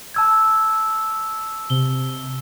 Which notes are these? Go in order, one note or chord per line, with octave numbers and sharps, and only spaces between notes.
A5 E6 G#6
C3 G7